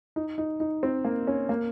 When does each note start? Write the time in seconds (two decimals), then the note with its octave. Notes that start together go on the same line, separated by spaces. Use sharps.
0.16 D#4
0.38 D#4
0.60 D#4
0.83 C4
1.05 A#3
1.27 C#4
1.49 A#3